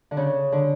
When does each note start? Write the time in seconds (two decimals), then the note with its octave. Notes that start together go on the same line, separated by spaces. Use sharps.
0.11 D3
0.17 C#3
0.52 D3